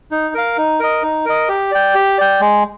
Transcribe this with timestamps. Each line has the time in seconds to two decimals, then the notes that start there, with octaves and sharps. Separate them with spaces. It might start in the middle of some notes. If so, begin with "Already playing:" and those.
0.11 D#4
0.34 A#4 F5
0.57 D#4
0.80 A#4 D#5
1.02 D#4
1.26 A#4 D#5
1.49 G4
1.71 D5 G5
1.95 G4
2.18 D5 G5
2.40 G#3